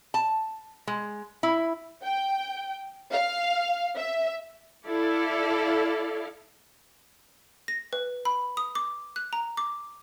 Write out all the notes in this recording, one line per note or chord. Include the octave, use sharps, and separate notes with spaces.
A5
G#3
E4
G5
F5
E5
E4 A4 D5 F5
A#6
B4
B5
D#6
D6
F#6
A#5
D6